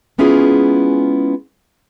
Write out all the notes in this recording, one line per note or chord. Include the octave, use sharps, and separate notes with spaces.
G#3 B3 C#4 E4 F4 G#4